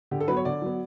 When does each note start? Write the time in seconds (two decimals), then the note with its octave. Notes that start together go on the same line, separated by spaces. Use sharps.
0.11 D3 G4
0.21 A4
0.28 F#3 B4
0.31 B3
0.37 C#5
0.45 D3 D5
0.62 F#3 B3